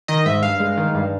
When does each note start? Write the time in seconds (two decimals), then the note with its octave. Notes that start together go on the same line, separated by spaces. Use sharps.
0.08 D#3 D#5
0.26 G#2 E5
0.43 G2 F5
0.60 G#3
0.77 D#3
0.94 G2